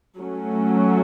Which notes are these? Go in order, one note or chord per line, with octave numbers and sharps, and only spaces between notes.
F#3 A3 C#4